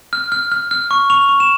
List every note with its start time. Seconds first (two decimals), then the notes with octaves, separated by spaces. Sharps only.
0.13 F6
0.32 F6
0.52 F6
0.71 F6
0.91 C#6
1.10 C#6 F7
1.29 C#6
1.40 E7